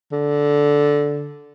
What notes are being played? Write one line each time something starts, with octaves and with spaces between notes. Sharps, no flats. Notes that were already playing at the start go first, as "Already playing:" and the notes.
D3